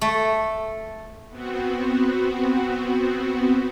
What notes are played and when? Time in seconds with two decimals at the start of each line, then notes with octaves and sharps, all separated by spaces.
0.01 A3
1.30 B3 C4 F#4